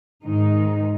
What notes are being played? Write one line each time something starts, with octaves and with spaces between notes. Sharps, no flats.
G#2 D#3 G#3 D#4